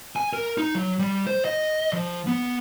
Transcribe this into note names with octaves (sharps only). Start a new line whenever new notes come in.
G#5
A#4
D#4
F#3
G3
C5
D#5
F3
B3